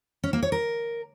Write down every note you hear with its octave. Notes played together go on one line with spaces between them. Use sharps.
C#4
A#3
C#5
A#4